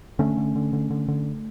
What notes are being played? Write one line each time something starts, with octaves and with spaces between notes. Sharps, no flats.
D3 A3 C#4
D3
D3
D3
D3
D3